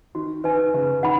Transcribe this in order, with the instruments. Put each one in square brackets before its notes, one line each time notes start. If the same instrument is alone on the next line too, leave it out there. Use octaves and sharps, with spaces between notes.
[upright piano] D#3 [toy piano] F#4
[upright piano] D#3 [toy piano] B4 G#5
[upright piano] C#3 [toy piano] B4
[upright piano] D#3 [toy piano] F#5 B5